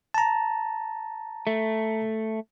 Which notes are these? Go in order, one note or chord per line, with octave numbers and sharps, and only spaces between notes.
A5 A#5
A3